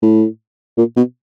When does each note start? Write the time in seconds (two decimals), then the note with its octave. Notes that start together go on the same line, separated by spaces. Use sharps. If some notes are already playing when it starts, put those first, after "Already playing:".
0.02 A2
0.78 A#2
0.96 B2